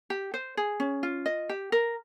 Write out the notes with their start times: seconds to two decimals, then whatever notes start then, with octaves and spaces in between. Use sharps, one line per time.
0.10 G4
0.34 C5
0.57 G#4
0.80 C#4
1.03 F4
1.26 D#5
1.49 G4
1.72 A#4